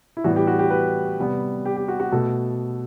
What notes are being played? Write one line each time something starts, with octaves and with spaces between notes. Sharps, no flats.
E4
A2 E3 G3 B3 F#4
G4
F#4
G4
B4
C3 G3 B3
G4
G4
F#4
F#4
B2 A3 A4